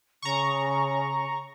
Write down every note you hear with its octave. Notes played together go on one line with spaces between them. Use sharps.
C#3 A#5 C#6